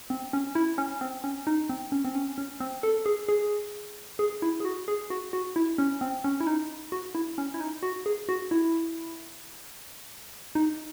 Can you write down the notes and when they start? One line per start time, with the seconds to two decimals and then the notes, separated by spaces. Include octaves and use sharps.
0.10 C4
0.33 C#4
0.55 E4
0.78 C#4
1.01 C4
1.24 C#4
1.47 D#4
1.69 C4
1.92 C#4
2.05 C4
2.15 C#4
2.38 C#4
2.60 C4
2.83 A4
3.06 G#4
3.29 G#4
4.19 G#4
4.42 E4
4.60 G#4
4.65 F#4
4.88 G#4
5.10 F#4
5.33 F#4
5.56 E4
5.78 C#4
6.01 C4
6.24 C#4
6.40 E4
6.47 D#4
6.92 F#4
7.15 E4
7.38 C#4
7.54 E4
7.60 D#4
7.83 F#4
8.06 G#4
8.29 F#4
8.51 E4
10.55 D#4